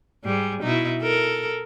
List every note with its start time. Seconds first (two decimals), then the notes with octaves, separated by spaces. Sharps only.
0.24 G#2 G3 G#4
0.61 B2 D#4 E4
1.02 A4 A#4